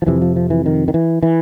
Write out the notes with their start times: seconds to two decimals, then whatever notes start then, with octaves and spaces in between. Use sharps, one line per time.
0.02 F3
0.07 F2 C3 E3
0.22 F3
0.36 F3
0.50 E3
0.66 D#3
0.88 D#3
0.94 E3
1.23 E3